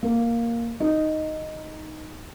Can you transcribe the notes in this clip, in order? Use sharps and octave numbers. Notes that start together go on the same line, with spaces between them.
A#3
D#4